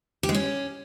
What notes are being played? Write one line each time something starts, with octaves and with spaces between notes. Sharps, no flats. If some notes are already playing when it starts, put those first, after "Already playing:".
G4
G#3
C#4